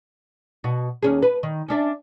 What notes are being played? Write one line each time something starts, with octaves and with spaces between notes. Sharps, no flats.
B2 F#4
D#2 C#4 G#4
B4
D#3
C#4 D4 E5